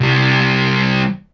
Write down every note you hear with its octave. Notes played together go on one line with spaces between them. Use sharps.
C2 G3